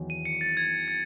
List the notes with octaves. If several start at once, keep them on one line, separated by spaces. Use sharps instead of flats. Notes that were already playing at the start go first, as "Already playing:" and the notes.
Already playing: E2 D#3 F#3
D#7
C#7
A6
G#6
A6